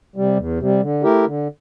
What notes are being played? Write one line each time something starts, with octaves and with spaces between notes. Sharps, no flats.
C3 G3
E2
C3 G3
D3
A3 E4 G4 A#4
D3